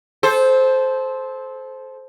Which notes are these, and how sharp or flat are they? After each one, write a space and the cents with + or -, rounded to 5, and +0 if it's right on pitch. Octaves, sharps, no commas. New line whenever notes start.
A4 -25 C5 +0